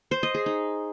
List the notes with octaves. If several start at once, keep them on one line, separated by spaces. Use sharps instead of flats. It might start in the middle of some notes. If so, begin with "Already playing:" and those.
C5
D#5
G#4
D#4